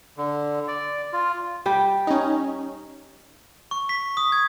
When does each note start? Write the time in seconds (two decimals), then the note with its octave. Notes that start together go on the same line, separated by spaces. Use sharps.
0.17 D3
0.68 D5
1.13 F4
1.66 G3 G4
2.07 C#4 D#4
3.71 C#6
3.89 B6
4.17 D#6
4.32 G#6